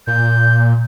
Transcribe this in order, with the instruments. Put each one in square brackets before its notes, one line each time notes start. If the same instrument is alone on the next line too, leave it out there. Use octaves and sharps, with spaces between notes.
[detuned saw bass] A#2 [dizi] G6